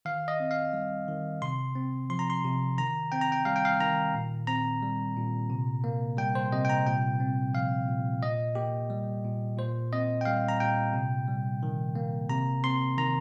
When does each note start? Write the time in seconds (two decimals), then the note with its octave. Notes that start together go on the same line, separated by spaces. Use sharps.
0.05 D#3 F5
0.28 D#5
0.40 C4
0.51 F5
0.73 G3
1.08 D#3
1.42 C3 C6
1.75 C4
2.10 F3 C6
2.19 A#5
2.30 C6
2.44 C3
2.78 D#3 A#5
3.12 C4 G5
3.21 A#5
3.32 G5
3.45 G3 F5
3.56 G5
3.65 F5
3.80 D#3 A#5
4.14 A#2
4.47 C4 A#5
4.83 G3
5.16 A#2
5.50 C3
5.84 A#3
6.17 G3 G5
6.35 C5
6.52 C3 D#5
6.65 G5
6.70 A#5
6.86 A#2 G5
7.20 C4
7.53 F3 F5
7.88 A#2
8.22 A#2 D#5
8.55 A#3 G4
8.90 G3
9.24 A#2
9.57 A#2 C5
9.92 C4 D#5
10.21 G5
10.25 G3 F5
10.49 A#5
10.60 A#2 G5
10.93 C3
11.28 G3
11.63 D#3
11.95 A#3
12.29 C3 A#5
12.64 C4 C6
12.98 D#3 A#5